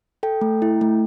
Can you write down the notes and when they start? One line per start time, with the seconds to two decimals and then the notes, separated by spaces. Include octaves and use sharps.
0.23 A4 G5
0.41 A3
0.62 E4
0.81 A3